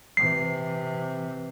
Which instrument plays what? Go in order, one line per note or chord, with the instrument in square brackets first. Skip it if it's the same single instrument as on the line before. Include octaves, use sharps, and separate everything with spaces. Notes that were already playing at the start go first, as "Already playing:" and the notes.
[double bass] C3 E3 [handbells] C7